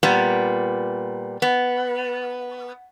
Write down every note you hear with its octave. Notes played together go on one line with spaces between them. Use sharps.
A#2 G3 B3
B3